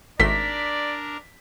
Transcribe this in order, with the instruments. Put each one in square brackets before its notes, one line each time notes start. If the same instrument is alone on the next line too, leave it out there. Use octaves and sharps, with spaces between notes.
[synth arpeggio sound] G#1 A3 C6 [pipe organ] D4 A#4 [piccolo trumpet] D5 [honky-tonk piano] B6